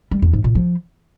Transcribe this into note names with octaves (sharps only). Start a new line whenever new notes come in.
G3
E2
G#2
A#2
F3